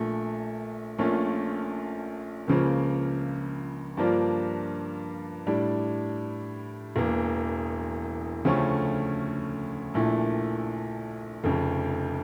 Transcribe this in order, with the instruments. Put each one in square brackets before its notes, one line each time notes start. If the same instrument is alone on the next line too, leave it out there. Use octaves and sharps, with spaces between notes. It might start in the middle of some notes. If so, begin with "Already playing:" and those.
Already playing: [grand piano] A#1 A#2 A3
A#1 A#2 A3 C#4 F4
C#2 C#3 F3 A#3
G2 F3 A#3 D4 F4
A2 G3 D4
E1 E2 E3 A#3
D2 C#3 F3 A3 C#4
A#1 A#2 A3 E4
F1 F2 C#3